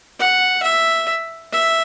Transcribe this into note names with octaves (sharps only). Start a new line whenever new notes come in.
F#5
E5
E5